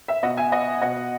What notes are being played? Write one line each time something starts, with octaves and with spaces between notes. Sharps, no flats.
E5
B2 D#5 F#5
E5 G#5
D#5 F#5
B2 D#5 F#5